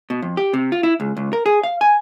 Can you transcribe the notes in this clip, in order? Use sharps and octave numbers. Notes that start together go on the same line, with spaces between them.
B2
F2
G4
C3
F4
E4
C#2
C#2
A#4
G#4
F5
G#5